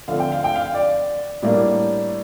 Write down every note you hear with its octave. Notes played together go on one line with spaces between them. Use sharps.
D3 F3 A3 C4 F5
G5
F5
G5
F5
D5
A2 G3 A#3 D4